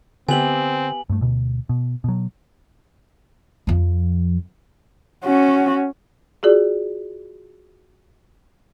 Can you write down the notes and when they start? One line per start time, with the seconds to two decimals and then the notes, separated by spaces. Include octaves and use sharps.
0.29 D3 B3 C4 G4 E5 G#5 F#7
1.09 G2 A3
1.21 D2 B2
1.69 B2
2.04 B2 F#3
3.67 F2 F3
5.24 C#4 F#4
6.43 F4 F#4 G#4 D5